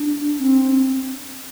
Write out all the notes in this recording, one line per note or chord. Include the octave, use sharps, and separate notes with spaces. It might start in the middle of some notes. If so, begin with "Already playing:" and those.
Already playing: D4
C4